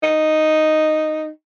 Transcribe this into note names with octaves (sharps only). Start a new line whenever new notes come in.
D#4